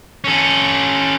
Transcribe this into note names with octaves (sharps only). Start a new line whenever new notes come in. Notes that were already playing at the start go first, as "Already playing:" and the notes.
C#4 A4